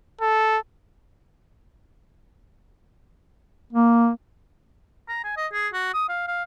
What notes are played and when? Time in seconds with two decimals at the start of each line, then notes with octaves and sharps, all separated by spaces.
0.21 A4
3.73 A#3
5.08 A#5
5.24 G#5
5.37 D#5
5.53 G#4
5.73 F#4
5.94 D#6
6.09 F5
6.28 F5